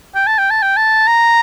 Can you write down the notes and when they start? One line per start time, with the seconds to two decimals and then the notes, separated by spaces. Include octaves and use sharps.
0.15 G5
0.27 A5
0.39 G5
0.51 A5
0.62 G5
0.77 A5
1.08 A#5